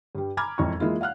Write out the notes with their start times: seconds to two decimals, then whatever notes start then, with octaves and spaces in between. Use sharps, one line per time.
0.15 G2 G3
0.37 G#5 A#5 B5 D6 F6 G#6
0.58 E1 F2 E3 A#5 C#6
0.80 E3 G#3 A#3 E4 F4
1.01 F5 F#5 F6 F#6